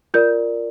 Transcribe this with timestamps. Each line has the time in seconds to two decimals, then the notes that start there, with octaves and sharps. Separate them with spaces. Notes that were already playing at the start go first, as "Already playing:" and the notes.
0.14 F4 A#4 D5 G6